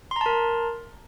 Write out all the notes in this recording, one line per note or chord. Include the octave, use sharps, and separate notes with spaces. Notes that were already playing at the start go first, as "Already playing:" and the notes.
A#4 A5 A#5 C6